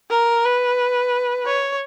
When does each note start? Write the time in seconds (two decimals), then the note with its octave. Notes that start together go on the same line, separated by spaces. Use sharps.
0.10 A#4
0.45 B4
1.45 C#5